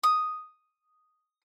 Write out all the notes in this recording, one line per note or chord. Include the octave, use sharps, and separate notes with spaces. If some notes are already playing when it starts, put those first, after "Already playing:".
D#6